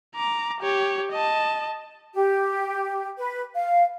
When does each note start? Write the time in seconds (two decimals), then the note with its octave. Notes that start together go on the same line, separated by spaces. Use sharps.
0.15 A#5 D6
0.61 G4 C#5
1.12 D#5 A5
2.14 G4
3.18 B4
3.55 F5